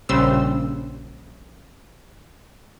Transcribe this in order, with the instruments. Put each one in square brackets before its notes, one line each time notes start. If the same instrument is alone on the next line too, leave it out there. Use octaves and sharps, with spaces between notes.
[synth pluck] A#1 C#3 G3 C5 E6